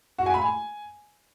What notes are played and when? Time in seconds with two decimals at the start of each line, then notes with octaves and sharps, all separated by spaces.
0.18 F#4
0.26 G#5
0.34 B5
0.42 G#5